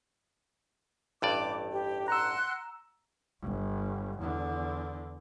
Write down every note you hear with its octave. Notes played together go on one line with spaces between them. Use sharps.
A1 G2 D5 D6
G4
F#5 A#5 C6 E6 F#6
G1
E2 D3